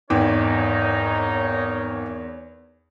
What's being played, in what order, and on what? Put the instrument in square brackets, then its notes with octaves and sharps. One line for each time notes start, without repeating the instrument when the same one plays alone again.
[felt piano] G#1 G5 D6 [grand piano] E2 [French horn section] D#4 [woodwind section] A#4 C#5